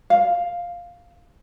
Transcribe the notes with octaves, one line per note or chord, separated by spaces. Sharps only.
F5